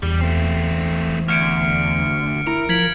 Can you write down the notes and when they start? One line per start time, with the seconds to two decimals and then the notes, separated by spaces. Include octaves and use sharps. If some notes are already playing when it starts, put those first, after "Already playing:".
0.03 E2 G3
0.21 A3 C4
1.28 D2 F6 C#7 D7
2.47 E4 A#4
2.69 F3 G#6 B6 F#7